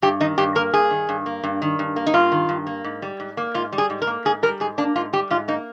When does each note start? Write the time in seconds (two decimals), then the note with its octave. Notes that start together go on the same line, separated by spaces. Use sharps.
0.02 G2 G4
0.20 D#3 D#4
0.38 G2 G4
0.55 A#3 A#4
0.73 G2 G#4
0.91 D#3
1.09 G2
1.26 A#3
1.44 G2
1.62 D#3
1.79 G2
1.96 A#3
2.07 D#4
2.14 G2 F4
2.32 D#3
2.49 G2
2.67 A#3
2.84 G#2
3.02 G3
3.20 G#2
3.37 A#3
3.54 G#2 F4
3.73 G3
3.78 G#4
3.90 G#2
4.02 A#4
4.07 A#3
4.25 G#2 G#4
4.43 G3 A#4
4.60 G#2 G#4
4.78 A#3 D4
4.96 G#2 F4
5.13 G3 G4
5.30 G#2 F4
5.48 A#3 D#4